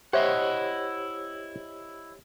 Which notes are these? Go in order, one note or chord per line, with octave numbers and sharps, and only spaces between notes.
E4 G4 C5 C#5 D#5 E5 F#5